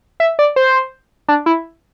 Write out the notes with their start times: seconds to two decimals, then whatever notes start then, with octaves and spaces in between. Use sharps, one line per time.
0.20 E5
0.39 D5
0.56 C5
1.29 D4
1.46 E4